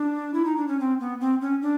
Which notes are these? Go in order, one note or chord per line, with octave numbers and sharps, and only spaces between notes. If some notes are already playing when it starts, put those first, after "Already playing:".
Already playing: D4
E4
D#4
D4
C#4
C4
B3
C4
C#4
D4